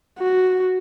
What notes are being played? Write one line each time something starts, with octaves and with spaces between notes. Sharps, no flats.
F#4